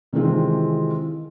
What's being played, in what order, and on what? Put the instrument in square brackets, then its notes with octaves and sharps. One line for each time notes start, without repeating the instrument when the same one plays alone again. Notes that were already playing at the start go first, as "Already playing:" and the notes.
[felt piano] C3 D#3 E3 G#3 C4 F4